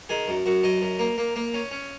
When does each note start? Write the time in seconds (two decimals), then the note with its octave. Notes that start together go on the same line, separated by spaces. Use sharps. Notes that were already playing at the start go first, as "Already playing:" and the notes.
0.09 D#3 G#4
0.28 F#2
0.46 F#2 F#4
0.63 F#2 D#5
0.82 F#2
0.99 A#3
1.18 A#3
1.36 A#3
1.54 C#4
1.71 C#4